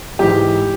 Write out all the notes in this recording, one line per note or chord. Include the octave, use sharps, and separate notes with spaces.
G#2 E3 G4